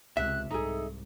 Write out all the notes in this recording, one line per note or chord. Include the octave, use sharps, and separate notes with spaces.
C#2 C3 E5 F#6
C2 G#2 D#4 G#4 A4